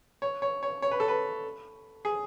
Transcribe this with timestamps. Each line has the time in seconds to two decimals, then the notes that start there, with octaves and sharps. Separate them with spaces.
0.22 C#5
0.42 C#5
0.63 C#5
0.82 C#5
0.91 B4
1.00 A4
1.08 B4
2.05 G#4